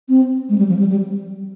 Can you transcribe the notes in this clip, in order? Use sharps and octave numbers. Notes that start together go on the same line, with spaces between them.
C4
G#3
G3
F3
G3
G3